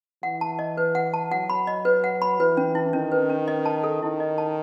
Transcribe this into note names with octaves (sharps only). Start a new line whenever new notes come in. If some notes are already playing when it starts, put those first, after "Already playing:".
E3 F#5
A5
D#5
B4
F#5
A5
F#3 F#5
B5
D#5
B4
F#5
B5
E3 B4
C#4
E4
D#3 C#4
B4
C#4
D#5
A5
A4
D#3 E4
D#5
A5